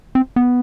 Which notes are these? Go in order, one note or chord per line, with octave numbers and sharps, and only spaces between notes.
C4
B3